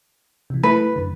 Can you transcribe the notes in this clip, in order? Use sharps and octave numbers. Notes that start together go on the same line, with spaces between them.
C3 E3
A3 E4 B4
F#2 D3